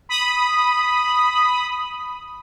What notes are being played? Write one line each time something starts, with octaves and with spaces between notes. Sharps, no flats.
B5 D#6